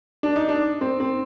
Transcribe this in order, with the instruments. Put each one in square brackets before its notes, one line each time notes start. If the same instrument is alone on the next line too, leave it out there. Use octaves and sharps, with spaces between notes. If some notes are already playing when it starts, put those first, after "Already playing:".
[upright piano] D4
D#4
D4
C4
C4